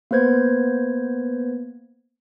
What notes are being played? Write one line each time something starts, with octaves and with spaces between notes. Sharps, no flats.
A#3 B3 B4 C5 G#6